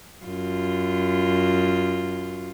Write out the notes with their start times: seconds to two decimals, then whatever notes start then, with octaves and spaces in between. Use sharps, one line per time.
0.25 F#2 F4